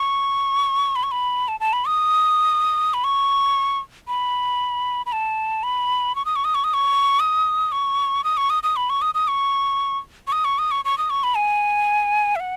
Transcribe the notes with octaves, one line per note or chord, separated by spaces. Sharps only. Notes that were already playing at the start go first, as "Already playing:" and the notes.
Already playing: C#6
B5
C#6
B5
A5
A5
B5
D#6
B5
C#6
B5
B5
A5
B5
C#6
D#6
C#6
D#6
C#6
D#6
C#6
D#6
C#6
D#6
C#6
D#6
D#6
B5
C#6
D#6
D#6
C#6
C#6
D#6
C#6
D#6
C#6
C#6
D#6
C#6
B5
G#5
E5
F#5